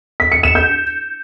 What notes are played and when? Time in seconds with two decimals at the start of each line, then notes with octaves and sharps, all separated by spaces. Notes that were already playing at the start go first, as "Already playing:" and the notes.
0.20 B6
0.32 C#7
0.43 E7
0.55 G6